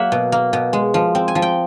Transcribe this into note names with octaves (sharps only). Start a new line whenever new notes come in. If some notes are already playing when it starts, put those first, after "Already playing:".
Already playing: F#3 A#3 E5 F#5
B2
A#3
B2
G#3
F3
C4
G#5
F3
G5